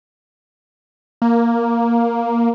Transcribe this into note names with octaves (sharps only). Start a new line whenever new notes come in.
A#3